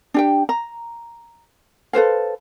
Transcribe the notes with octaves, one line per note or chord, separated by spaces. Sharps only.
D4 G4 G5
A#5
A4 B4 C5 F5